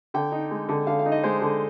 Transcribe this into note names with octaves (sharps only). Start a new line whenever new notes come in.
D3 G5
D#4
G#3
D3
D3 F5
F5
D#4
D#5
G#3 C5
D3